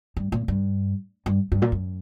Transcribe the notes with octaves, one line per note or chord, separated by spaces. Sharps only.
G2
A#2
G2
G2
G2
A#2
F#2